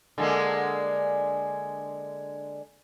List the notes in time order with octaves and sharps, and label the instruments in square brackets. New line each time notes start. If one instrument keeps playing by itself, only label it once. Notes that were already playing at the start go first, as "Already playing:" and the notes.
[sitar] D3 G#3 A#3